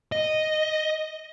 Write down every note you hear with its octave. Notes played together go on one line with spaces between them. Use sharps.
D#5